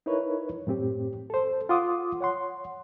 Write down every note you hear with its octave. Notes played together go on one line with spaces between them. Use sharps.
D#4 E4 A#4 B4 C#5
F#2 A2 C4 G4
A4 C5
F4 F#5 C6 D6 D#6
C#5 F#5 C6